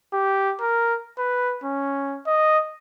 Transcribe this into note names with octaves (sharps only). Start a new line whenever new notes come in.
G4
A#4
B4
C#4
D#5